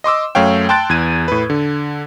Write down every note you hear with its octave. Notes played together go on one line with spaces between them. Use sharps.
D#5 C6 D6 E6
F#2 A3 C#5 F5 G5
G5 A5 C6 F#6 A6 D7
E2 G#6 D#7
A2 B4
D3